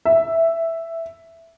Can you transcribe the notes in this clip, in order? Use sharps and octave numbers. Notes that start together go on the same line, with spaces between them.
E5